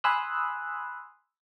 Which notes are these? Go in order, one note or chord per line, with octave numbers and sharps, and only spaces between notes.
G#5 B5 C6 D#6 E6 F#6